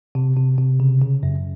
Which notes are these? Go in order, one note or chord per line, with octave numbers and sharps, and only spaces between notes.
C3
C3
C3
C#3
C#3
F#2